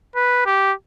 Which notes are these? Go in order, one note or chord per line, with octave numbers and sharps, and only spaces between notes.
B4
G4